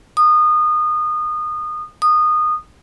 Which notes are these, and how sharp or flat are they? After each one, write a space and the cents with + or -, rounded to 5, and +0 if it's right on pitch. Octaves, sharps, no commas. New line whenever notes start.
D#6 -25
D#6 -20